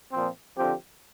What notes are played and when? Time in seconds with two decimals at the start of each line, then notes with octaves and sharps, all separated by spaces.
0.13 A#2 F3 C4
0.58 D3 F3 C4 G4